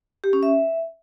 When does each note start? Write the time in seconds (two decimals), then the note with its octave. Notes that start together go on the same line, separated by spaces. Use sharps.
0.24 G4
0.33 C#4
0.43 E5